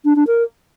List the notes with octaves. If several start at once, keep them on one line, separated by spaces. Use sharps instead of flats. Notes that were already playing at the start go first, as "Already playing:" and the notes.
D4
D4
A#4